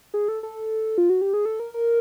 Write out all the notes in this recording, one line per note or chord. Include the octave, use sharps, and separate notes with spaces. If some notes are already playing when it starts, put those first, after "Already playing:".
G#4
A4
A4
F4
F#4
G4
G#4
A4
A#4
A#4